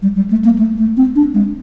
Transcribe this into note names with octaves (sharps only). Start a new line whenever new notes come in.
G3
G3
A3
A#3
A3
A3
C4
D4
G#3